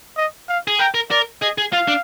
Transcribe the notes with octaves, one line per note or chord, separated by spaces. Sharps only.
D#5
F5
G#4
A#4 G5
A#4
A#4 D5
G#4 D#5
G#4
F4 F5
D4